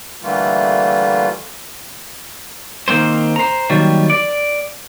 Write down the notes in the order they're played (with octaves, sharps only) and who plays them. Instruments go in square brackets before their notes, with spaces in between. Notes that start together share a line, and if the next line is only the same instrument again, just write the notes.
[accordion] D3 E3 G3 A3 A#3 F4
[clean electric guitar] D#3 A#3 C4 C5
C5 A#5
D#3 F#3 G3 A#3
D5